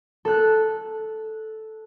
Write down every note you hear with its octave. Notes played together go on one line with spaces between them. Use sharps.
A4 F#6